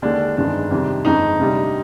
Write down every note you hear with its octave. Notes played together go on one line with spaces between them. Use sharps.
D#2 D3 G#3 D4
G1 F2 D#3 G#3 D4
F2 C3 D#3 G3
G1 F2 D#3 G#3 D#4
D2 C3 G3